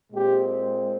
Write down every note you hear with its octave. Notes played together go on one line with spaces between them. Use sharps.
A#2 G#3 C4 G4